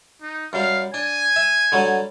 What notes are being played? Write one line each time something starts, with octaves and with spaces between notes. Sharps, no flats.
D#4
F#2 G3 F5
D4 G#5
E5
D3 F#3 G3